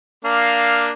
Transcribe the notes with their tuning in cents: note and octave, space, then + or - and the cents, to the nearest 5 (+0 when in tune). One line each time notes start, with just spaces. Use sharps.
A#3 +0 D4 +0 F5 +0